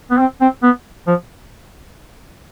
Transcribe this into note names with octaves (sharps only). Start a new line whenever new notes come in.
B3
C4
C4
B3
F3